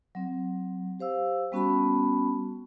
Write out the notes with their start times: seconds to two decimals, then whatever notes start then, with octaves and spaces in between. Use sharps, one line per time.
0.15 F#3 C4
1.00 G4 C5 F5 E6
1.52 G3 B3 C#4 F#4 A5 B5